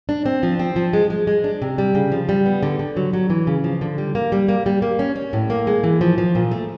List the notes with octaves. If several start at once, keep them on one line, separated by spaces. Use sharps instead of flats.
D4
C4
F3
C4
F3
G#3
G#3
G#3
D4
C3
G3
C#3
F3
G3
B3
D3
D3
F#3
F#3
E3
C#3
F3
D3
G3
A#3
G3
A#3
G3
A#3
C#4
C#4
A2
A#3
G#3
E3
F3
F3
A#2
A3